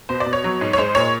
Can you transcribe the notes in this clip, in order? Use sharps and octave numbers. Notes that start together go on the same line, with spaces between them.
B2 C5
D5
B2
C#5
F#3
G#2
C#5
G#3 C5
A#2 C#5